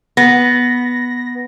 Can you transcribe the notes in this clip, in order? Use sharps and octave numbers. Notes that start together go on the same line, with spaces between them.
B3 A#6